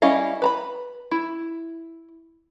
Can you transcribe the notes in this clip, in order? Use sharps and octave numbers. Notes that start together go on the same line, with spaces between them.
G3 C#4 E4 D#5 F5
B4 A#5 B5
E4